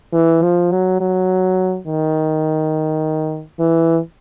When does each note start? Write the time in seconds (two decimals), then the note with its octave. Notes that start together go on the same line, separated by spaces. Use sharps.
0.13 E3
0.42 F3
0.71 F#3
1.00 F#3
1.87 D#3
3.59 E3